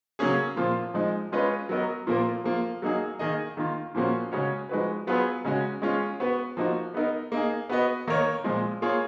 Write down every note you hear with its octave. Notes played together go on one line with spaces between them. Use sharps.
C#3 F#3 A#3 C#4 G#4
A#2 F3 A#3 F4
F3 G#3 D#4
G#3 C#4 F4 B4 D#5
F#3 B3 F#4 A#4 D#5
A#2 F3 A#3 F4 A#4
F3 A#3 F4
F#3 A#3 D#4 G#4
D#3 A#3 D#4 G#4 D#5
D#3 A#3 F4
A#2 F3 A#3 C#4 F#4
C#3 G#3 C#4 F#4 C#5
F3 G#3 D#4 F#4 B4
F#3 B3 F4 G#4 B4
C#3 G#3 C#4 F#4
G#3 C#4 F4 G#4 C#5
B3 F#4 B4
F3 A#3 D#4 F#4
B3 D#4 A#4
A#3 D#4 G#4
B3 F#4 B4 D#5
D#3 A#3 D#4 A#4 C#5
A#2 F3 G#3
A#3 F4 G#4 C#5